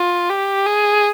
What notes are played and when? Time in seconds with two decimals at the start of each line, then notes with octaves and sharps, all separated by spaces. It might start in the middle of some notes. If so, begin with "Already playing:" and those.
Already playing: F4
0.30 G4
0.66 G#4